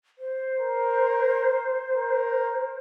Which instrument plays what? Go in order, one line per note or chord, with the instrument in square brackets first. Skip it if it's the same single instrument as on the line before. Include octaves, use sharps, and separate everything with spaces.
[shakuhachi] C5
[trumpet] A#4
A#4